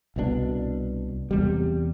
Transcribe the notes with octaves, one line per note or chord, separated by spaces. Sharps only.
C2 B2 G3 D4
E2 C3 G3